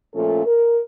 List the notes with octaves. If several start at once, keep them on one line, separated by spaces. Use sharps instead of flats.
A#2 F3 A3 C#4 A4
A#4